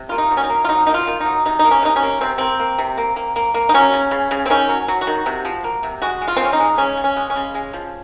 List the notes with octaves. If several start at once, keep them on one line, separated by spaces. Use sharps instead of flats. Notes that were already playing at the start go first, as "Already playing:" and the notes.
Already playing: C3
A#3 F4
D#4
F#3
C#4
D#4
A#3
F4
F#3 D#4
A#3 D#4
F4
D#3
D#4
F#3
C3 D#4
D#4
A#3
C#4
C3 D#4
C#4
A#3
C3 C4
A#3 C4
A#3
C3
A#3
A#3
A#3
A#3
D#4
F#3 C#4
C#3
C#3
C#3
C4
D#3 C#4
F#3
F#3
F#4
D#3
C3
F3
A#3
C3
G#3 F#4
G#3
F4
C4
G#3 C#4
D#4
G#3
C#3 C#4
C#3
C#4
G#3
C#4
C#3
G#3
F3